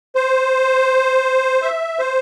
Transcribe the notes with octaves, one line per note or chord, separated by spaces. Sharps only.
C5
E5
C5